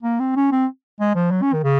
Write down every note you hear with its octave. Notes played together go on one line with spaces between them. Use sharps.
A#3
C4
C#4
C4
G#3
F3
F#3
C#4
D#3
C#3